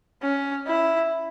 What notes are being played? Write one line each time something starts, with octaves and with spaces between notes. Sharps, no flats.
C#4
E4